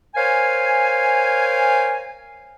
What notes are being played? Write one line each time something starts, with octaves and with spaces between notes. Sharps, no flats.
A#4 C5 C#5 F5 G#5